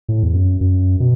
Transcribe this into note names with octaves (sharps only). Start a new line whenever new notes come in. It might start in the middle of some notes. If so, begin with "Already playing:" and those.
A2
E2
F#2
F#2
B2